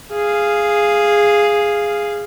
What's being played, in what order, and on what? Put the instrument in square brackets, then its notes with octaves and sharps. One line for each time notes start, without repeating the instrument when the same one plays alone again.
[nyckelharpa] G#4 F5